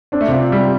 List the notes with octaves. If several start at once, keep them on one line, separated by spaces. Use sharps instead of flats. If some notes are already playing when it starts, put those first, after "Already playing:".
C4 D4
A3
C3 C4 F4
G3